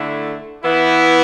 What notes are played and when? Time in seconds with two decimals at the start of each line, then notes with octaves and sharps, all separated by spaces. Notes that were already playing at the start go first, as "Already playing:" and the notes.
Already playing: D3 A3 E4
0.64 E3 B3 E4